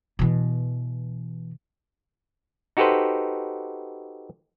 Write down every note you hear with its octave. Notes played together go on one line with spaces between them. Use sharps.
B2 E3
D#4 F#4 G4 A4 B4 C5